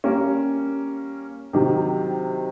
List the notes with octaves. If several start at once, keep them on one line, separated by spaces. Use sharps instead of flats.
G3 A#3 C#4
C3 D#3 F#3